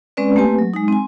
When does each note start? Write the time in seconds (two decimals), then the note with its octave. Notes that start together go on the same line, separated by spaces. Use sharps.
0.17 G#3 C4 C#4 B4 D5
0.36 A3 A#3 C4 G4 B4 G#5
0.59 F#3
0.74 G#3 D#4
0.88 C4 G#5